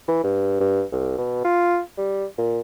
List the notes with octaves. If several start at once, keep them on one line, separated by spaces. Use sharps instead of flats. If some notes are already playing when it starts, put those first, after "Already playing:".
E3
G2
G2
C2
B2
F4
G3
A#2